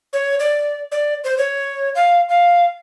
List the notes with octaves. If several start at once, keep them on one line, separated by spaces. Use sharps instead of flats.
C#5
D5
D5
C5
C#5
F5
F5